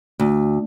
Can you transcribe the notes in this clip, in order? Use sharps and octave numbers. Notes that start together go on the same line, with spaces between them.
D2